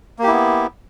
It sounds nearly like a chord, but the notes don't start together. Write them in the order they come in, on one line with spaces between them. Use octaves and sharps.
A#3 G4 E4 B3